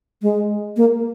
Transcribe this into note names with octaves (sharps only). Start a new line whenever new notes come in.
G#3
A#3